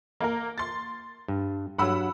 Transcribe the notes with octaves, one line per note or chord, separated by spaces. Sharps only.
A#3 A#4
C6 A6
G2
G2 F#3 F#5 B5 E6